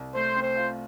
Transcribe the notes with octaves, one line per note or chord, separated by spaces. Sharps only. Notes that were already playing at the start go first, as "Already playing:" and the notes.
Already playing: C2
A3 C5
C4
C5
F4